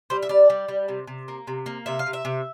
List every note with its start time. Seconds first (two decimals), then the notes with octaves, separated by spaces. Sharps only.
0.10 G3 C5
0.22 E5
0.29 G3 D5
0.50 G3
0.68 G3
0.88 C3
1.07 C3
1.28 A#3
1.47 C3
1.66 A#3
1.86 C3 E5
1.99 F5
2.06 C3
2.13 E5
2.25 C3